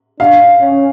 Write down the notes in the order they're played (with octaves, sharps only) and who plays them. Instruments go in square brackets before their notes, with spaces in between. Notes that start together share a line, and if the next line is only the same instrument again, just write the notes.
[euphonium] D4 [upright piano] F5
[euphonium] C#4